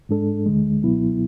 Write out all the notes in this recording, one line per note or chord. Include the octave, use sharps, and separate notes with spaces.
G#2 G#3 D4 A4
D2 D3 G#3
C#2 B2 F#3 B3 E4